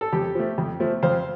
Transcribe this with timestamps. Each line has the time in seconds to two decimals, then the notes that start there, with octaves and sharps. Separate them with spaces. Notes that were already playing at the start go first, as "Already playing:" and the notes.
0.01 A4
0.12 F2 G4
0.35 F3 A3
0.58 F2
0.80 F3 A3
1.03 F2 C5 F5